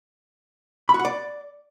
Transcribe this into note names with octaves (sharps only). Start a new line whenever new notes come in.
B5
F#4
F#5
D5